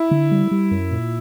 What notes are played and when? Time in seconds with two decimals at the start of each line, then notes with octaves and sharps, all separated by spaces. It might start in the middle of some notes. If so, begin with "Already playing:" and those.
Already playing: E4
0.11 D3
0.31 G3
0.51 G3
0.71 F#2
0.91 A#2